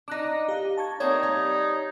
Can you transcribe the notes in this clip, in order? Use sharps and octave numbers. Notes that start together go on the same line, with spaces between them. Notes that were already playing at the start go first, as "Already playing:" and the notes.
D4 D#4 D6 F#6 A#6
G4 F5
A5 C#6 G#6
A3 A#3 C4 D#4 C#5 D5 G#6
G3